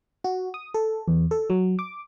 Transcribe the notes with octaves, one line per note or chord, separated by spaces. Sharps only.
F#4
D#6
A4
E2
A4
F#3
D6